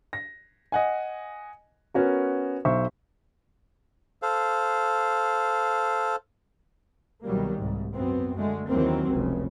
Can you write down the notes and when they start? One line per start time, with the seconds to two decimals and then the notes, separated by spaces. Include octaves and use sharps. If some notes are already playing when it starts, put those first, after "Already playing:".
0.13 A#6
0.72 D#5 F#5 G#5
1.94 B3 C#4 F#4 A#4
2.65 B1 C5 E5 C#6
4.22 A4 C5 F5
7.24 C2 B2 D#3 F#3 G3 A#3
7.55 C2 G#2
7.94 F#2 B3 C4
8.37 D3 G#3 A3
8.68 D#2 E3 F#3 A#3 C4
9.10 F1 C#2 C#3